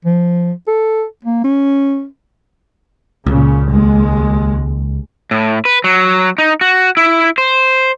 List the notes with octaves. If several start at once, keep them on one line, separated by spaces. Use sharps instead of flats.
F3
A4
A#3
C#4
C#2 A#2 C#3
D#2 G#3
A2
B4
F#3
D#4
F#4
E4
C5